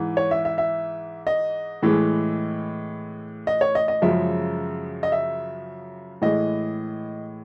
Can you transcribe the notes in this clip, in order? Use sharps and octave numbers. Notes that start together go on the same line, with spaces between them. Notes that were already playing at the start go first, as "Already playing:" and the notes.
Already playing: G#2 E3
C#5
E5
E5
E5
D#5
A2 E3 G#3
D#5
C#5
D#5
D#5
F#2 C#3 F3 G#3 E5
D#5
E5
A2 E3 G#3 D#5